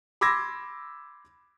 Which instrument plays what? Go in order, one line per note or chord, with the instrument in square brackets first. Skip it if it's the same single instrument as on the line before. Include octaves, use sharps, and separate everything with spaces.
[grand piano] B5 C6 D6 E6 G#6 A#6